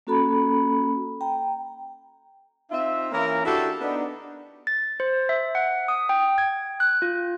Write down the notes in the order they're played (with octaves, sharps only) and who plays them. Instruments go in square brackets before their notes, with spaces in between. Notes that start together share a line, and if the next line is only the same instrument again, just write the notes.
[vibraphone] A#3 C#4 F#4 A4 A#5 B5
G5 A#5
[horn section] C4 D#4 F4 E5
E3 A#3 C#4 E4 A#4
D4 E4 F#4 G4 A4
B3 D4 D#4
[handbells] A6
C5
E5
F#5
D#6
G5
G#6
F#6
F4